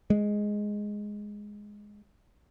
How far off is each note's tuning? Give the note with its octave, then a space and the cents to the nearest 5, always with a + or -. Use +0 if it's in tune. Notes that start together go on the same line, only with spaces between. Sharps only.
G#3 +0